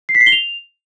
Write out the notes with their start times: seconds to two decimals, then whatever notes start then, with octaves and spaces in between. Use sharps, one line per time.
0.09 C7
0.15 B6
0.21 C7
0.26 G7
0.32 F7